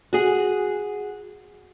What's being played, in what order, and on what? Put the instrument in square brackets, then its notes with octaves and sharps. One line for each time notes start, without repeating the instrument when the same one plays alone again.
[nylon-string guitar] F#4 G#4